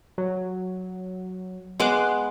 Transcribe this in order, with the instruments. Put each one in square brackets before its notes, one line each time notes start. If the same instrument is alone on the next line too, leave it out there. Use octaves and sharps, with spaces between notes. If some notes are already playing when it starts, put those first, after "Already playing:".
[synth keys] F#3
[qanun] G#3 B3 D6 [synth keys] C6 F#6